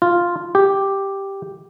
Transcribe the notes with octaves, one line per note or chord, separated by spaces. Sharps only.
F4
G4